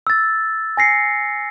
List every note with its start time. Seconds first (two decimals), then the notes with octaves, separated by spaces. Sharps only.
0.07 E6 A6
0.77 G#5 A#6 C7 C#7